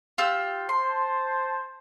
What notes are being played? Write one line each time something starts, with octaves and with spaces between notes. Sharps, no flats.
F4 G4 E6
C5 A5 C6